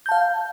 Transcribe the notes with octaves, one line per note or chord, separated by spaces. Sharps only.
F5 A5 G6